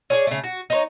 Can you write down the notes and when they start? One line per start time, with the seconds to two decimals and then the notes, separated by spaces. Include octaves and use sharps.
0.10 C#4 G#4 D5
0.27 C#3 A3
0.44 F#4
0.70 D#4 C5 C#5